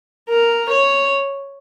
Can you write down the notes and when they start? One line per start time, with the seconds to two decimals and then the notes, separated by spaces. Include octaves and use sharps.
0.29 A#4
0.70 C#5